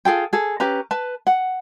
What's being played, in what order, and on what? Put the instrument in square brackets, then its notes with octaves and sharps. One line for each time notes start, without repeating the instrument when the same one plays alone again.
[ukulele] F4 G#4 A4 G5
G#4 A4
C#4 G4 B4 A#5
B4 A5
F#5